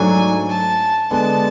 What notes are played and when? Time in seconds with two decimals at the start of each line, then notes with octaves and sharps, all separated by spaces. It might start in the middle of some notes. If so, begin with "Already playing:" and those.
Already playing: G#2 F#3 A3 D4 G#5
0.50 A5
1.11 D3 G#3 B3 D4 A5